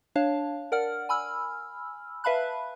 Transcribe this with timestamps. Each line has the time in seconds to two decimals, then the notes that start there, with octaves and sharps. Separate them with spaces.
0.16 D4 C#5 F5 A5
0.72 A#4 D5 F#5 F6
1.09 G#5 B5 E6 F6
2.24 B4 E5 F5 A5 B5 F#6